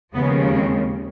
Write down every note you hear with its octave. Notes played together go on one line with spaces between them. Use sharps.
D#2 C#3 F3 G#3 B3
C4